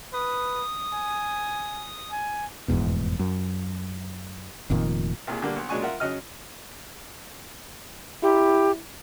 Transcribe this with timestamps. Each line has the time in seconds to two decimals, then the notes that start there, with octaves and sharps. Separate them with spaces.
0.13 B4 D#6
0.93 G#5
2.11 G#5
2.68 F1 E2 G#2 B2
3.19 F#2
4.70 F1 F2 A#2 D#3
5.27 C2 A#2 G#4
5.42 D3 G3 A#3
5.56 B1
5.69 A#2 F#3 G#3 D4 G#5 C#6
5.81 F4 A#4 E5 F#5
6.00 C#3 F#3 D#5 F6
8.23 E4 G4